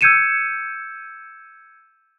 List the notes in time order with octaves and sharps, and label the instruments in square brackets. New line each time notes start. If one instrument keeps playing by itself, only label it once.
[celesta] E6 G6 G#6 C#7 D#7 E7